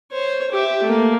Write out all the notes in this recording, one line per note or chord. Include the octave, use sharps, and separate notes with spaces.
C5 C#5
G4 E5
A3 A#3